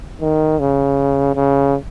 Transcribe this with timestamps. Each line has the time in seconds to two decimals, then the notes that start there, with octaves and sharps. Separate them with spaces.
0.21 D#3
0.60 C#3
1.35 C#3